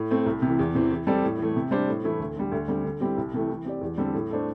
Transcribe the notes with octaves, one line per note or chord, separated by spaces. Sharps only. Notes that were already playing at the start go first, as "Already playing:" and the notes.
Already playing: A2
A3 C4
C2
C3 E3
E2
C3 E3 C4
E3
G3 C4 A4 D5
A2
E3 A3
C3
G3 D4 C5
A2
E3 A3 E4
D2
D3 G3
D2
D3 G3 C4
D3
G3 C4 E4 G4
C2
C3 E3 A3
E3
C4 G4 D5
E2
D3 G3 C4 A4
A2
A3 D4 C5